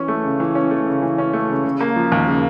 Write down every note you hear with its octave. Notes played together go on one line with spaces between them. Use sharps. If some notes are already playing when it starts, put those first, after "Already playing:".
Already playing: E3 C#4
A3
C#3
E3
C#4
A3
C#3
E3
C#4
A3
C#3
C#3
A#3
F3
D#2
C#3